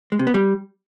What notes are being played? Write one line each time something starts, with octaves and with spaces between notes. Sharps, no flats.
G#3
C3
B3
G3